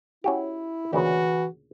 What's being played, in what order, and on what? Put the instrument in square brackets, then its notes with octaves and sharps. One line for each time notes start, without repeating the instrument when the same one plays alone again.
[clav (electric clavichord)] C#4 F#4 G4 [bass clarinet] E4
[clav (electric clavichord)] D2 A#2 C#3 [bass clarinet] E3 [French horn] F#4